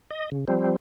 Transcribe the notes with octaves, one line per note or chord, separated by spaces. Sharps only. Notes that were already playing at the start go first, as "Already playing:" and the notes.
D#5
C#3
F3 G3 C4